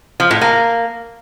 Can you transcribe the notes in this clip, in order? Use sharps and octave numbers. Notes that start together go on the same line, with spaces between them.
F3
A2
A#3